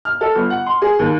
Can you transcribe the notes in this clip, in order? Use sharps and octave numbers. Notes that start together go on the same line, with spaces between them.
F6
A4
G1
F#5
C6
G#4
D#2